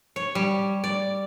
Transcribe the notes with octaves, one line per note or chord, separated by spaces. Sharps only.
C#5
G3
D5